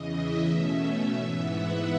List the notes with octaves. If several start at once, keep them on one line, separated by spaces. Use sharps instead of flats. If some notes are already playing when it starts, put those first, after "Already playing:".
Already playing: E2 C#3 E3 D#5
E5
B2 A3 C#4
G#2 E3 B3 E5
F#5